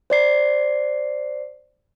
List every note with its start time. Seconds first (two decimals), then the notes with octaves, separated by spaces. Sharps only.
0.10 C5 D5 C7